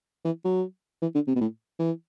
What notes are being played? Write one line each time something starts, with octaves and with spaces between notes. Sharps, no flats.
E3
F#3
E3
D3
C3
B2
A2
E3